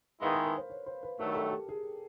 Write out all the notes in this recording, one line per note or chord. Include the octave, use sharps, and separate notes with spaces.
D#3 G#3 B3 E4 G#4 F5
B4
A#4
C5
C#5
C5
B4
G2 D#3 F#3 A3 A#4
A4
G4
G#4